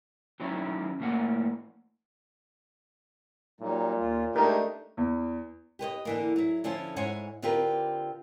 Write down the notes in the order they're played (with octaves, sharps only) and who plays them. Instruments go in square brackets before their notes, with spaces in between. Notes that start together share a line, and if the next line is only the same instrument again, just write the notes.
[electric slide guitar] D#3 E3 F#3 C#4 D#4 E4
A2 E3 A#3 F#5
[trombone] A#2 [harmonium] F#3 G3 D#4
[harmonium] D#2 F4
[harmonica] G#3 D#4 G4 [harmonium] A3 D4 [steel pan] A#4
[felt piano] E2
[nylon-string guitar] G4 B4 C5 D#5
D3 E3 A#3
F#3 E4
D3 F3 C#4 E4 F4
G#2 E4 C5 C#5 F#5 G#5
D3 C4 F4 G4 A#4 B4